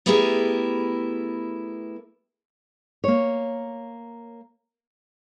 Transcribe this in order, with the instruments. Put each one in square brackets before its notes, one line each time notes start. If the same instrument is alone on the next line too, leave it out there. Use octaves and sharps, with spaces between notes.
[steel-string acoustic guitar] A3 B3 E4 G4 G#4 A#4
[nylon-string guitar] A#3 C#5